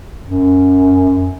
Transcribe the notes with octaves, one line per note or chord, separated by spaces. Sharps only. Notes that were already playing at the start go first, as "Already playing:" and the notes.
F#2